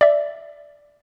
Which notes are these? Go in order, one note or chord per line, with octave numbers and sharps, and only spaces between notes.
D5 E5